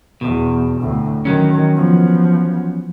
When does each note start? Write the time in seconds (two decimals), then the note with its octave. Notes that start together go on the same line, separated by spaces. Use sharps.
0.21 E2 B2
0.81 D2 A2
1.25 D#3 E3 F#3 C#4
1.76 F3 B3